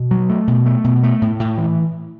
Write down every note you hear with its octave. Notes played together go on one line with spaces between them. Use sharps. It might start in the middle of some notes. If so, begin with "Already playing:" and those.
Already playing: B2
F#3
A3
B2
A3
B2
A3
A2
A2
E3